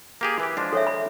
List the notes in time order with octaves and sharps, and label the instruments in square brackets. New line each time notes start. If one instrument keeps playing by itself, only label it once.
[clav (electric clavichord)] A#3 G4 G#4
E3 G4
F3 G#3 D4
[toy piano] A4 C#5 E5
B5